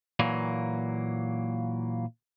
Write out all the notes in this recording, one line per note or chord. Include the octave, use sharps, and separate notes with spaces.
A#2 E3 F#3 A#3